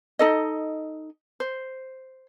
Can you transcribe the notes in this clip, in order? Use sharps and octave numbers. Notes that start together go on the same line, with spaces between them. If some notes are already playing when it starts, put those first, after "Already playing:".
D#4 A4 D#5
C5